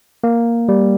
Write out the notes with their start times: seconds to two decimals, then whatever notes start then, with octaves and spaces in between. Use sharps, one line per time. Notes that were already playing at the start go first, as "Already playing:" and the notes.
0.24 A#3
0.69 G3